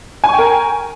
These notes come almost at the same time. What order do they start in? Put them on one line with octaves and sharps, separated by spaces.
G#5 C#6 G5 A#4